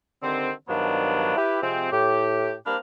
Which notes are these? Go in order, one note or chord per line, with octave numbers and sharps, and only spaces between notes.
D3 D#3 G3 C4
G2 D#3 F3 F#3 B3 D4
E4 G4 B4
C3 F3 G#3 C4
A2 G4
G3 A#3 C4 D4 B5 F6